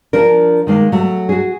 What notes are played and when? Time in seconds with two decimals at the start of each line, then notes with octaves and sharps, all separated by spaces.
0.13 F3 D4 A#4
0.67 D#3 G#3 A#3
0.92 F#3 A3
1.29 F#4 G#4